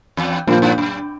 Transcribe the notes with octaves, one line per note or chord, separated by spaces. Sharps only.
E2
F#2 A#2 F3 A#3
G2
F#2